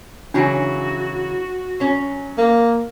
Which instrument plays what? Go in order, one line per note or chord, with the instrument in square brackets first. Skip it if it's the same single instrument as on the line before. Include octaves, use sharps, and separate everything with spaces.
[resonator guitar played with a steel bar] C#3 E3 F#3 [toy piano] D4 G#5 [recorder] F#4
[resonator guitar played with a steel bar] F#3 C#4
[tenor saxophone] A#3